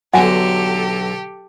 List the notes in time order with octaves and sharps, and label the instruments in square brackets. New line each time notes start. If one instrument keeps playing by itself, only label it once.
[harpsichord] B1 D3 [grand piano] F#3 [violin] G4 A4 [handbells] F#5 G#5